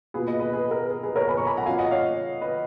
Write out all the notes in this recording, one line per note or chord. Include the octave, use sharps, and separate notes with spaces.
B2 A#3 F4 G#4 B4
B4 D#5
B4 D#5
G#4 B4
A#4
G#4
G#4 B4
A#4 C#5
G#5 B5
A#5 C#6
G#5 B5
F#5 A#5
F#3 C#4 F4 F5 G#5
D#5 F#5
C#5 F5
B4 D#5